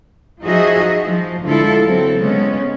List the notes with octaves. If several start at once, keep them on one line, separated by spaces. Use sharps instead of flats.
F3 D#4 F#4 G#4 D#5 E5
F3
D3 G#3 E4 F4 A4
F#3 C4 A4
C#3 G#3 B3 C#4